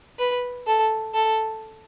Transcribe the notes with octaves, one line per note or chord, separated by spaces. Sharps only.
B4
A4
A4